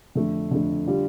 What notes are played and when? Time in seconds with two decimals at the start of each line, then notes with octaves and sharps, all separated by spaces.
0.15 F2 D3 A3
0.51 F2 D3 A3
0.87 D3 G3 F4